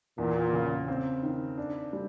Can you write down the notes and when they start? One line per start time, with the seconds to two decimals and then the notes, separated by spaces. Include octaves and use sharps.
0.18 E2 A#2
0.53 C#3
0.88 C4
1.23 D#3
1.58 D4
1.93 G3